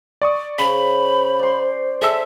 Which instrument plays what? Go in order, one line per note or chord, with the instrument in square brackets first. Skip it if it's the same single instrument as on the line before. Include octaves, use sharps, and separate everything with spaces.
[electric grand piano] D5 C#6 D#6
[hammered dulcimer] C#3 [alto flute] C5 [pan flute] B5 [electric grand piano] B6
[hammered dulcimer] D5 C6
[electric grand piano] G#4 A4 E6 [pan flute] E5